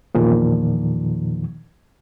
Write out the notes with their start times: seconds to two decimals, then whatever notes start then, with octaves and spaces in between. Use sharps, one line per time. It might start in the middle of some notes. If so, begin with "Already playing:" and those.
0.15 E2 A#2 D#3 F3